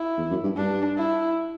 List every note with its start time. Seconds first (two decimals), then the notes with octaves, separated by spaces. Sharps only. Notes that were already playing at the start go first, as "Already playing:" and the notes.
Already playing: E4
0.18 E2
0.30 F#2
0.44 G2
0.57 G2 D4
0.98 E4